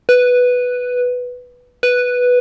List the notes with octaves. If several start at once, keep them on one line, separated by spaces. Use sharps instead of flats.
B4
B4